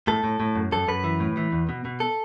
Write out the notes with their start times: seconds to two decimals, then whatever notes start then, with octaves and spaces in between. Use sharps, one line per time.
0.07 A2 A4
0.24 A2
0.40 A2
0.55 F#2
0.72 F#2 A4
0.88 F#2 B4
1.04 E3
1.20 A2
1.37 E3
1.52 E2
1.69 B2
1.85 B2
2.00 A4